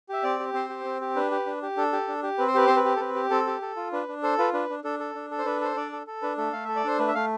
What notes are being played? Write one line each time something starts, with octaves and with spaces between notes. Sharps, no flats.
G4 E5
C4 D5
G4
C4 C5
G4
C4
G4
D4 B4
G4
D4
G4
D4 A4
G4
D4
G4
C4 B4
C5
G4 B4
C4 C5
B4
G4
A4
C4 B4
G4
C4 A4
G4
A4
F4
D4 B4
D4
A4 C5
F4 B4
D4 B4
D4
D4 A4
A4
D4
A4
C5
D4 B4
A4 C5
D4 D5
A4
A4
D4 B4
A3 A4
A3 F5
A4 E5
D5
D4 C5
A3 B4
E5
A3 F5